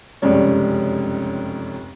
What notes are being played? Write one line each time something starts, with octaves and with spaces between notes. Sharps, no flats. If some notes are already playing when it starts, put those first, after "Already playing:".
F1 C#2 F#2 G3 G#3 C#4